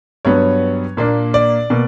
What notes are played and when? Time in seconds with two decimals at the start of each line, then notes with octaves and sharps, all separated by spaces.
0.25 G2 F#3 B3 C#5
0.97 A#2 A#3 D4
1.34 D5
1.70 B2 A#3